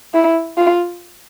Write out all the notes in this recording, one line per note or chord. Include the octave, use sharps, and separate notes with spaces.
E4
F4